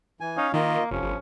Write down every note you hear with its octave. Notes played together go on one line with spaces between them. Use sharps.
E3 G#5
C#4 D#4 C#5 F5
D#3 A#3 F4 D#5
F1 F3 C#4
G1